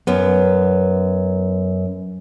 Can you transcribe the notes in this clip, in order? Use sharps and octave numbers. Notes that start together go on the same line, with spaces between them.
F#2 B3